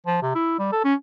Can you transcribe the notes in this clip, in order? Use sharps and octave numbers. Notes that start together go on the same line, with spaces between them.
F3
C3
E4
G3
A4
C#4